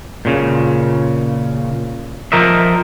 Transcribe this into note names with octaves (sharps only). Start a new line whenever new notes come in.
A#2 C#3
F3 A#4 D#5 E5